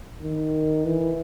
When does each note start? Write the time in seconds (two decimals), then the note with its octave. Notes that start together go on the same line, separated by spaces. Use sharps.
0.23 D#3
0.85 E3